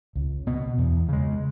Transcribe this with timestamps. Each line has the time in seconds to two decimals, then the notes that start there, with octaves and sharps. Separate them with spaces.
0.16 C#2
0.47 B2 B3
0.78 E2
1.09 C#3 G#3